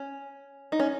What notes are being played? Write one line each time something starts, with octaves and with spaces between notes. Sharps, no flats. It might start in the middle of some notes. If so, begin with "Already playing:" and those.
Already playing: C#4
D#4
C#4